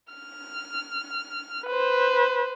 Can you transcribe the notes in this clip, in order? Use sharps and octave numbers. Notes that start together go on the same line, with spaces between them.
F6
B4 C5